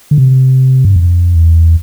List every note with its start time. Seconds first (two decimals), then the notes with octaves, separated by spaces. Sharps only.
0.11 D3
0.18 C3
0.85 G2
0.96 F2
1.35 E2